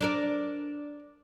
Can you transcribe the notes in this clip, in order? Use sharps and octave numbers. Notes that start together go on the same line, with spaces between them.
D4 A#4 D5